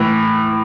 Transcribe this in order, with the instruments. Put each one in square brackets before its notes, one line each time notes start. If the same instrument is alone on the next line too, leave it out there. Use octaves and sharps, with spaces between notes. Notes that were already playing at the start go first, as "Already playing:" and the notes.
Already playing: [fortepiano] A2 E3